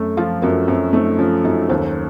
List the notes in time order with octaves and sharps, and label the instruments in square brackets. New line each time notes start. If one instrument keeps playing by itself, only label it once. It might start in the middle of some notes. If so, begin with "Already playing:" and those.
Already playing: [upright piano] F#2 A3
[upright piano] F3 [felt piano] F4 A4
[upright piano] F#2 [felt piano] F#4 A#4
[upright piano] F#2 [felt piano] C4
[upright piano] A3 [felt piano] C4 D#4
[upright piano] F3 [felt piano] C#4
[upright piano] F#2 [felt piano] D#4 F#4
[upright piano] D#2 [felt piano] A4 C5